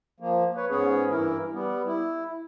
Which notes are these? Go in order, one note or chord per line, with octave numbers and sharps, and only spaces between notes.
F3 A#3
B4 C#5
G#2 B3 C#4 G#4 C#5
G2 E3 E4 A#4
G3 B3
E4